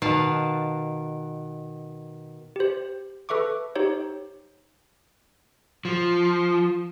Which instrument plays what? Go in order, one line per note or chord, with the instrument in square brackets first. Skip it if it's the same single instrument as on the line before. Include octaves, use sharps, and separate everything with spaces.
[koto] B2 D#3 F5 F#5 A5
[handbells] G4 C5
A4 B4 E5 C#6 D6
D#4 G4 C5 C#5
[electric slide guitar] F3